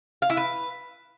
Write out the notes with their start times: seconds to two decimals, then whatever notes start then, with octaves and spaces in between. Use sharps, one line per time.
0.22 F5
0.30 E4
0.37 B4